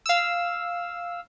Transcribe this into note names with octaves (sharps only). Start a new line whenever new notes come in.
F5 E6